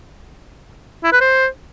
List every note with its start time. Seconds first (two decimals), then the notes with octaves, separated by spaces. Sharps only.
1.04 E4
1.12 B4
1.21 C5